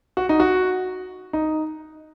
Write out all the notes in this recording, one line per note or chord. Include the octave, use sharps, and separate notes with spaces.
F#4
D#4
F#4
D#4